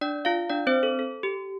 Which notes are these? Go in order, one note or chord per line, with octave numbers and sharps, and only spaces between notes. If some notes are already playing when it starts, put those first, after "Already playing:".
D4 D5
F4 F5
D4 D5
C4 C5
A4
A4
G4